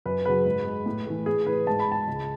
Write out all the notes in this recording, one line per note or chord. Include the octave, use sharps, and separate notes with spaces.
F#2 B4
C#3 F#3 B4
G#2
G#3
A2
E3 A3
A2 G#4
E3 A3 B4
G#2 A5
B5
G#3 A5
C#2